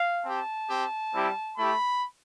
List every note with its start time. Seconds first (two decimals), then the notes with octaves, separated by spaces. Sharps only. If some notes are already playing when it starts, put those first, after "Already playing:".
Already playing: F5
0.24 C4 G4 A5
0.69 C4 G4
1.13 G3 C4 E4 G4
1.58 A3 E4 G4 B5